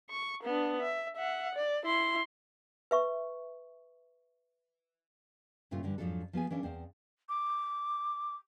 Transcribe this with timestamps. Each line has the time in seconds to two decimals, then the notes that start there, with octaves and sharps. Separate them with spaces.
0.10 C#6
0.43 B3 D4
0.82 E5
1.16 E5 F#5
1.55 D5
1.85 E4 C6
2.91 B4 E5 C#6
5.71 G2 A#2 C#3 A3 F4
5.83 G2 D3 E3 G3
5.98 F2 G#2 F3 F#3 D4 A4
6.33 F3 B3 G#4 G#5
6.50 E3 C#4 D4 F5
6.63 E2 C4 D5 F5
7.29 D6